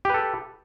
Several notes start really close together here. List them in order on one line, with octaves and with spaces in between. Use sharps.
G4 B4 A4